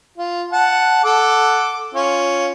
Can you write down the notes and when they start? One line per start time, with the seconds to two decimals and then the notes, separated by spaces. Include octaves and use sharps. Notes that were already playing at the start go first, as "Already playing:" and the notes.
0.18 F4
0.52 F#5 A5
1.04 A4 F#5 D6
1.94 C#4 F4